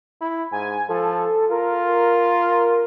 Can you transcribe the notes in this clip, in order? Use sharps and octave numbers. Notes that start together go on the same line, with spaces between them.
E4
G#2 G#5
F3 A4
F4 A#4